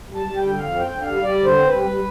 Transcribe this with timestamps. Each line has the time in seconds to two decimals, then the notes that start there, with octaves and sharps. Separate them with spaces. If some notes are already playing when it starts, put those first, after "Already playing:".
0.09 G3
0.15 A5
0.26 G3
0.37 G5
0.42 D3
0.58 F2 F5
0.75 C4
0.80 G5
0.91 D3
1.01 F5
1.07 G3
1.23 G3 D5
1.40 D3
1.45 C5
1.57 C4
1.67 B4
1.72 G3
1.89 G3